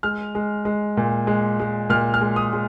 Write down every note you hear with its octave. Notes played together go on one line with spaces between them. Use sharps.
G#3 F6
G#3
G#3
A#2
G#3
G#3
A#2 F6
F6
G#3
D#6
G#3